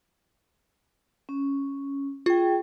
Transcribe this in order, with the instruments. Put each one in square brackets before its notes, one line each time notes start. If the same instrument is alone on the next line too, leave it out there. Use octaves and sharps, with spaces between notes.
[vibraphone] C#4
[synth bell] F4 [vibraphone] G#4 G5